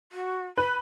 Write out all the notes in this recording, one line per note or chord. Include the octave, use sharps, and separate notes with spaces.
F#4
B4 B5